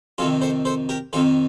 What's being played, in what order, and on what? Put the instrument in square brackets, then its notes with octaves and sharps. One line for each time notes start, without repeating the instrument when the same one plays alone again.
[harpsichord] F2 C3 D#3 F4 A4
A4 C5
A4 C5
G4 A#4
F2 C3 D#3 F4 A4